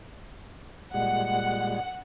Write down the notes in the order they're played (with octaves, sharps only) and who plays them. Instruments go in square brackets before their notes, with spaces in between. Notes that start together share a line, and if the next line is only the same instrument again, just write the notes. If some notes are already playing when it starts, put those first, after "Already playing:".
[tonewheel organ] A#2 G3 G#3 [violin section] F#5